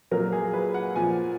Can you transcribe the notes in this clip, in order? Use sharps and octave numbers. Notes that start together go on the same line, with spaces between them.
A#2 F#3 A#4
G#4
B4
F#5
A#2 F3 G#5